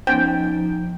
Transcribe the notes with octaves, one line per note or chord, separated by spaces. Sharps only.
F3 B3 C#4 D#4 C5 G5